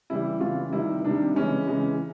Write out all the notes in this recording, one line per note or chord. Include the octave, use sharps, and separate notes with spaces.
C#3 E3 G3 E4
C#3 E3 G3 F4
C3 D#3 G3 E4
C3 D#3 G3 D4
C#3 E3 G#3 C#4
C#3 E3 G#3